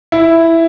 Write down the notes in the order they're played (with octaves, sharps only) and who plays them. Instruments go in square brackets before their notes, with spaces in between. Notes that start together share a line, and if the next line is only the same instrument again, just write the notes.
[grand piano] E4